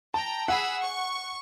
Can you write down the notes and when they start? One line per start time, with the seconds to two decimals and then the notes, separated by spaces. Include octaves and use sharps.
0.14 G5 A5 A#5
0.48 G#4 F#5 B5 E6
0.81 C#6